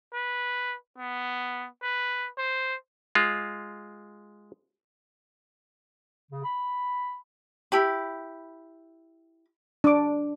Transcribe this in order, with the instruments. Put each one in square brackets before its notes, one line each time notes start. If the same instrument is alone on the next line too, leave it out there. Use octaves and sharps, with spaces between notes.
[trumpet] B4
B3
B4
C5
[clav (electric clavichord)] G#3 F4
[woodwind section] C#3
B5
[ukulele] E4 G4 B5
[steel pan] D4 D6